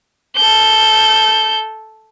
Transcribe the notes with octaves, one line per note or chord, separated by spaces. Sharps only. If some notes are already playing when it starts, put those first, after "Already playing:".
A4 G6